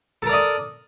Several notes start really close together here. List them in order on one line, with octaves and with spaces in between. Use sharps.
A4 A#4 D5 D#5